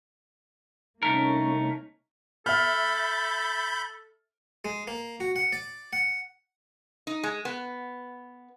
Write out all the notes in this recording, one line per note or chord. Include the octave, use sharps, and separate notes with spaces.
C2 A3 A#3 C#4 D#4 A#4
A4 E5 B5 F6 G6
G#3
A#3
F#4
F#5
D5
F#5
D#4
G#3
B3